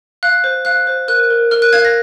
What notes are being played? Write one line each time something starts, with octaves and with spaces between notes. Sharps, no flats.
F5 F#6
C5
F5 F#6
C5
A#4 F#6
A#4
A#4 F6
F#6
F5 G#6
A#6